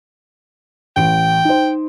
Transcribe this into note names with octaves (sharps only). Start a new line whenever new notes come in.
A1 G5 D7
D#4 C5